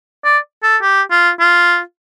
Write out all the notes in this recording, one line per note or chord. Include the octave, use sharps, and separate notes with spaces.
D5
A4
G4
F4
F4